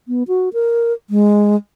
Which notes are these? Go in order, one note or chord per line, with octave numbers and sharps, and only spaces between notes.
B3
F#4
A#4
G#3